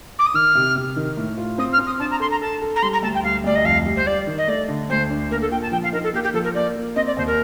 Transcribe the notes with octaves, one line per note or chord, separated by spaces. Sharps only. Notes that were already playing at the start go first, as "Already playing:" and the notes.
D6
D#6
D#3 F6
C3
C3
D#3
A2
F4
C4 D#6
F6
C4
D#6
D4 A5
A#5
A4 C6
A#5
A4 A5
A4
A#5
G3 C6
A#5
D2 A5
G5
G3 F5
D2 D5
D#5
F2 F5
G3
C5
G3 D5
D#3
D#5
A3 D5
D3
D2 C5
D4
A#3 A#4
A4
A#2 G5
A5
F3 G5
F5
D#4 A#4
A4
A#3 G4
G4
F3 A4
A#4
A#3 D5
A#3
C4 D#5
D5
D#2 C5
A#4